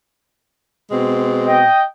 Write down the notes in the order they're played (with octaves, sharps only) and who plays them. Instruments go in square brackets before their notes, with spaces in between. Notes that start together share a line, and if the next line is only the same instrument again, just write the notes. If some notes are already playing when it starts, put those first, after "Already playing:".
[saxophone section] B2 G#3 C4
[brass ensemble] D#5 G5